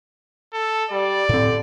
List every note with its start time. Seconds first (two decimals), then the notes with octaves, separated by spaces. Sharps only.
0.53 A4
0.91 G3 D5
1.29 A2 D3 C4